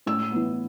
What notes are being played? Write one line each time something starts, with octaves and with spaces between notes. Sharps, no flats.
A2 E6
E3 B3